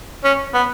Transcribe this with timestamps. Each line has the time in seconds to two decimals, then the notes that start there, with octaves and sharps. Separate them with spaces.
0.24 C#4
0.54 B3